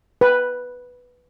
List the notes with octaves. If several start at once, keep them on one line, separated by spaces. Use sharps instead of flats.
B4